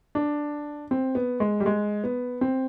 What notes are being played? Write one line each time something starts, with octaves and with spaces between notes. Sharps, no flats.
D4
C4
B3
G#3
G3
G#3
B3
C4